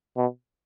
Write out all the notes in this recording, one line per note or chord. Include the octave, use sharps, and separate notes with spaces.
B2